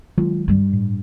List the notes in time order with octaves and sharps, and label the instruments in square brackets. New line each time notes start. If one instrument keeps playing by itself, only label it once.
[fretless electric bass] D#3 F#3 G#3 [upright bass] F4
[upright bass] G2 G3
[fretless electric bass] A2